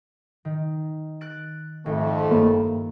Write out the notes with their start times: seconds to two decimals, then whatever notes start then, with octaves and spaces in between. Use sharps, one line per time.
0.45 D#3
1.21 F#6 A6 D7
1.86 G#1 F2 A3 C4
2.31 G2 A#3